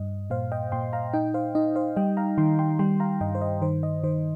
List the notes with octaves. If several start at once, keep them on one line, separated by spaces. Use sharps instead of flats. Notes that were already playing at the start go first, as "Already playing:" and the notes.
Already playing: G2 D#5
A#2 C5 F5
D#5 G5
A#2 G5 C6
F5 A#5
D#4 D#5 G5
C5 F5
D#4 D#5
C5 F5
G3 D#5 G5
F5 A#5
D#3 G5 C6
G5 C6
G3 G5 C6
F5 A#5
G2 D#5 G5
C5
D#5
D#3 C5
D#5
D#3 C5